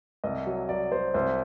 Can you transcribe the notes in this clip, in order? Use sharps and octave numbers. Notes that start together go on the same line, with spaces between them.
C2 D#5
F#3
F#3 D5
F#3 C5
C2 C5